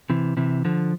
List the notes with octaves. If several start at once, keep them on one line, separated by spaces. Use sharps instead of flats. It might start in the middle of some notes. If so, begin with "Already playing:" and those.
C3 E3
C3 E3
D3 F3